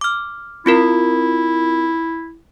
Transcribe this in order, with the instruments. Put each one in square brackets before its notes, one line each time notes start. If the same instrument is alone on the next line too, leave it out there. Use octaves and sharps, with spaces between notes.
[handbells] D6 F6
[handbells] C4 F4 A#4 [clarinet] E4